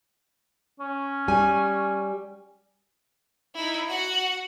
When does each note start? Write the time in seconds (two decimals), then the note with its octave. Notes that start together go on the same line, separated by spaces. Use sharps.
0.80 C#4
1.28 G3 G#5
3.55 D#4 E4
3.90 F#4 F#5